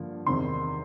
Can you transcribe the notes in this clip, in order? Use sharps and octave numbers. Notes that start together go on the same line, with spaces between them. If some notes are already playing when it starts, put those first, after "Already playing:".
Already playing: G2 D3 F3 A#3
E2 C3 D#3 C6